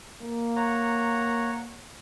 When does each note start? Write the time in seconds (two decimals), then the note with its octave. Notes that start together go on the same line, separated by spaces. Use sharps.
0.22 A#3
0.56 C#5 F#5 A#5